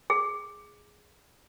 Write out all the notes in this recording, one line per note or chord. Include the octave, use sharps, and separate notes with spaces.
G#4